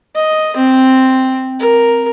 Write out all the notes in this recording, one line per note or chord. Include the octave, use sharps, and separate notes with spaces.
D#5
C4
A#4